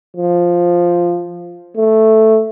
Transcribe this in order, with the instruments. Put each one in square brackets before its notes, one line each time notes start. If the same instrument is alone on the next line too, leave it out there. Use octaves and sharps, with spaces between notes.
[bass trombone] F3
A3